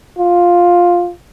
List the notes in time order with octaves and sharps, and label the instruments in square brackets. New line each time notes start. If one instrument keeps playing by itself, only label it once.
[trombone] F4